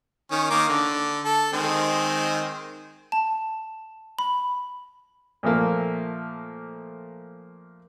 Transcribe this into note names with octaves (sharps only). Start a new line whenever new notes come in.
D#3 C#4
D#3 A#3 D6
D3
A4
D#3 G#3 C4
A5
B5
A#2 F3 A3 A#3